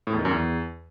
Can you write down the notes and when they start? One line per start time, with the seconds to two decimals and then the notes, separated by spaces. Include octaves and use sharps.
0.07 A2
0.13 E2
0.19 D#3
0.25 F#2
0.31 E2